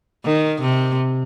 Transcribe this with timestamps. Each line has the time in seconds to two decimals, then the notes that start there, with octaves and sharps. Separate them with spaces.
0.25 D#3
0.62 C3